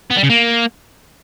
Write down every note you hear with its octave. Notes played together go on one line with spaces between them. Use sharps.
B3
G3
C#3
A#3